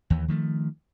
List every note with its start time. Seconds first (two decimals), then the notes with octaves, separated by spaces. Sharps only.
0.10 D#2 E3
0.28 D#3 F3 A3